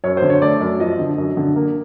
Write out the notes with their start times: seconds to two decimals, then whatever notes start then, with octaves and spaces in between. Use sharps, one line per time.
0.04 F#2 C#5
0.17 C5
0.22 D3
0.30 C#5
0.42 A3 D5
0.61 F#2
0.80 F3 D#5
0.99 D3
1.18 F#2
1.37 D3
1.56 A#3